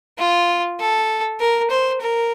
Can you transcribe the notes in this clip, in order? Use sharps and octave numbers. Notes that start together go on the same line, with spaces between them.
F4
A4
A#4
C5
A#4